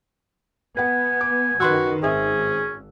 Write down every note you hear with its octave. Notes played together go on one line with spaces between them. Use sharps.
B3 B4 F#5 G#5
D6
F#2 D#3 F#4 B4 C6 E6
G#1 C4 C#4 G#4 E5